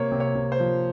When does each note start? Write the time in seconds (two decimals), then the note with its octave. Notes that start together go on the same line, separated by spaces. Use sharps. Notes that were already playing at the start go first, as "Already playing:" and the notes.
Already playing: C3 A#3 C#5
0.12 C3
0.20 C#5
0.35 C3
0.52 C5
0.60 F3